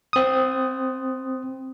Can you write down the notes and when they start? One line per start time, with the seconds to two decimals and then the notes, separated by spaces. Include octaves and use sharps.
0.13 C4 D#6